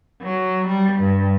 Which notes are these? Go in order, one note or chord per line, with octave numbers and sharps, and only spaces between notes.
F#3
G3
G2